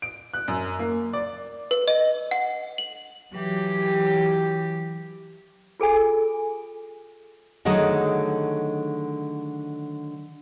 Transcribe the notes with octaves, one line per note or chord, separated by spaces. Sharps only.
D7
F#6
F#2
A#3
D5
B4
D#5
F#5
F#7
E3 F#3 G4
F4 G#4 A4 G#5
D3 D#3 F#3 A3 G#4 D#5